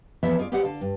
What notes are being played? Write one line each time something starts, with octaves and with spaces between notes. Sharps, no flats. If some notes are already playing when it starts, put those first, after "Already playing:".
E3 F3 B3 A4 E5
F4 G#4 C#5 D5
G4 G#4 B4 C5 D5 F#5
D3 F5 A5
G2